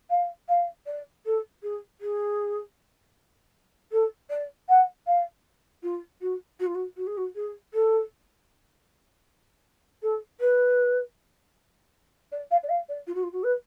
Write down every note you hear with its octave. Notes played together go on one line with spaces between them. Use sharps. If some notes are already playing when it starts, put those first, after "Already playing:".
F5
F5
D5
A4
G#4
G#4
A4
D5
F#5
F5
F4
F#4
F#4
F4
F#4
F#4
G#4
F#4
G#4
A4
A4
B4
D5
F5
D5
F5
D5
F4
F#4
F4
F#4
B4